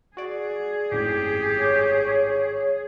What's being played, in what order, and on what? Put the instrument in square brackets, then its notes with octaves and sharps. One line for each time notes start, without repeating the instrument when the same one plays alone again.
[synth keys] F#4 D5 [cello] G#4
[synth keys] G#1 F#2 A2 [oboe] G4
[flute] C#5